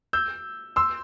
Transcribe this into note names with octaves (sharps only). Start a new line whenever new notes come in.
E6 G6
C6 E6